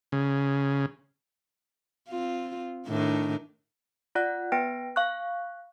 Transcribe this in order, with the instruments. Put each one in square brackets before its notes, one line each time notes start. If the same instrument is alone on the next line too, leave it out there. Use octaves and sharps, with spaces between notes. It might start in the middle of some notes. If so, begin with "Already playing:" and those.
[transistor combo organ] C#3
[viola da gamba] C4 F4
A2 D#3 D4
[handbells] F4 D5 F#5 F#6
B3 B4 G5 A#6 D7
F5 C#6 F#6